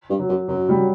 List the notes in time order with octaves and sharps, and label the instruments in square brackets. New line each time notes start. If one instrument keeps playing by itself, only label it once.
[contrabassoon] G2
[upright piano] F#3
[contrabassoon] F#2
[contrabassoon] F#2 [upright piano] F#3
[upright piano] G3
F#3